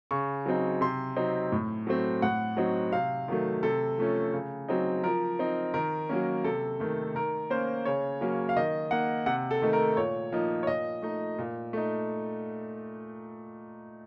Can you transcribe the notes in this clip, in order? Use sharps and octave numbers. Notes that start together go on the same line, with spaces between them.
C#3 C#6
F#3 C4 D#4
C3 C6
F#3 C4 D#4
A2
F#3 A3 C4
A2 F#5
F#3 C4 D#4
C3 F5
D#3 F#3 A3
C3 A4
F3 A3 C#4
C#3
F#3 C4 D#4
F3 A#4
C4 D#4
D#3 A#4
F#3 A#3 C#4
C3 A4
D#3 A3
D#3 A#4
A#3 C#4 C5
C#3 C#5
F#3 A#3 C#4
F5
D#3 D#5
A#3 D#4 F#5
C3 F#5
A4
D#3 A3 D#4
A#4
A#2 C#5
F3 A#3 D#4
C#5
A#2 D#5
A3 D#4
A#2
A3 D#4